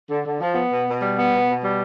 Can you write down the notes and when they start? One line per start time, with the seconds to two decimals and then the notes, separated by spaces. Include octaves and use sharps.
0.09 D3
0.24 D3
0.40 F3
0.55 B3
0.70 B2
0.86 B2
1.01 G3
1.17 B3
1.32 B2
1.47 B2
1.62 G3